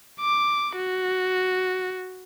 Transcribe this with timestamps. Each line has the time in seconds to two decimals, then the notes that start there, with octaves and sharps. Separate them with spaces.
0.20 D6
0.76 F#4